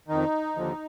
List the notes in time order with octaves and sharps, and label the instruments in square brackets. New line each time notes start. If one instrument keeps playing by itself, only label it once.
[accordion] F2 D#3 D#4
D#2 D3 F3